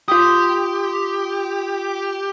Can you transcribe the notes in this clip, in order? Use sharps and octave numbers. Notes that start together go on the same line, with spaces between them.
F4 G4 D#6